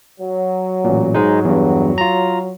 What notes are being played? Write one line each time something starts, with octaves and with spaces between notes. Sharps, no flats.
F#3
A1 A#2
G#2 G#3 D#4
E2 G2
F4 A#5